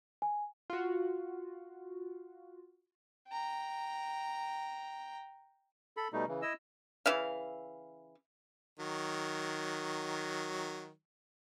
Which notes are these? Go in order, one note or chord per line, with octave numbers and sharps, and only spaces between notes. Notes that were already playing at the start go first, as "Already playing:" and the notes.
G#5
F4 F#4
G5 A#5
A4 B5
B2 G3 A3 D#4
C#3 E3
E4 D#5 E6
C#3 E3 E5 F5
D#3 F#3